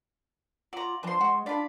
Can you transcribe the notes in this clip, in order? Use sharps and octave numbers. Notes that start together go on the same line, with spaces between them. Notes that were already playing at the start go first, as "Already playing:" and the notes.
F#3 F4 D5 A#5
F3 C4 D4 B4 C5 C6
G#3 F#4
D4 F4 D5 F5 B5